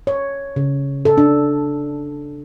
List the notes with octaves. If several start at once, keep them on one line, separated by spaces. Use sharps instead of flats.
C#5
C#3
A4
D4